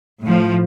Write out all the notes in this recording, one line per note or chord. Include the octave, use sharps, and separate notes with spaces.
A2 F3